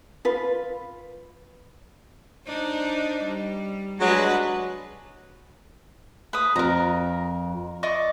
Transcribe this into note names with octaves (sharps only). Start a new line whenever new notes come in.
F4 B4
D4 D#4 C5
G3
F#3 G#3 D4 B4
B4 D#6
F2 A#4 A#5
D5 D#5 C#6